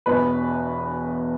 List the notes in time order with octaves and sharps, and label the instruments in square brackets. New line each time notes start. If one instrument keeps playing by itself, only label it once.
[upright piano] E1 E2 B2 B4